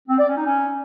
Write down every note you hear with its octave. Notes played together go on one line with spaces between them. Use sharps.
C4
D5
C#4
D#4
C#4